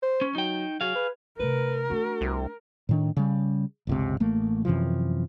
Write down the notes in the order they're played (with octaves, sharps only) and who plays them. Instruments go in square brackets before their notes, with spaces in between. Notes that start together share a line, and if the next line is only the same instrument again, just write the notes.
[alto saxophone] C5
[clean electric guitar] C#4
[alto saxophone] F#3 [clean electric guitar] D#4 G5
[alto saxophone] F#3 [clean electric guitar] G#4 F5
[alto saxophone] B4
[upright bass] C3 A3 [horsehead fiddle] A#4 [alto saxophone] B4
[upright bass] A3 D4 [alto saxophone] F#4
[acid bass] C2
[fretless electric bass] A2 D#3 D4
C#3 G3
G1 C#2 C3
A1 A3 A#3
F#2 C3 E3 F3